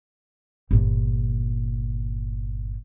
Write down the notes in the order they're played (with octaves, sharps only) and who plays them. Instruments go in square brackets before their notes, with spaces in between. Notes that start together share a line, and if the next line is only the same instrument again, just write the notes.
[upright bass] G1 A#2